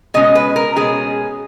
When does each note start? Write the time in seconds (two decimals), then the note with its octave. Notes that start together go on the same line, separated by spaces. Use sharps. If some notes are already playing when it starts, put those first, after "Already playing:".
0.14 B2 G#3 C#4 D#5
0.35 B4
0.56 A#4
0.76 B2 G#3 C#4 G#4